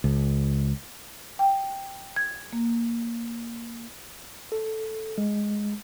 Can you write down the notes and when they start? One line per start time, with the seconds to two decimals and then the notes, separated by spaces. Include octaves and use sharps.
0.04 C#2
1.39 G5
2.16 G#6
2.53 A#3
4.52 A4
5.18 G#3